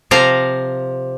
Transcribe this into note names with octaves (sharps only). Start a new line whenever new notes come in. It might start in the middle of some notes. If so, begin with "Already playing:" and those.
C3 F3 F5 A#5